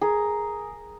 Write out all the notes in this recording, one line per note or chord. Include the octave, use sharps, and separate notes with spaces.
G#4 A#4